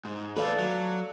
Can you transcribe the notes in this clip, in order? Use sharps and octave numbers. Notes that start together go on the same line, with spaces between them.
G#2
D#2 A4 B4 D5 F5
F#3